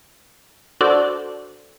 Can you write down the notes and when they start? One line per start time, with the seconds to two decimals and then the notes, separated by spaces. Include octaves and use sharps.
0.81 D4 F#4 A4 C5 D5